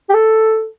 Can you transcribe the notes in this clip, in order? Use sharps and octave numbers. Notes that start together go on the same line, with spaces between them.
G4
A4